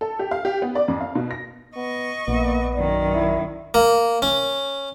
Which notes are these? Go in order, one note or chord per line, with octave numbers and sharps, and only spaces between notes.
A4
G4
F5
G4
B3
D5
F2
F5
B2
A#6
B3 D#5 C#6
A#1 A#3 B3
F#2 D#3 D5
E4
A#3
C#4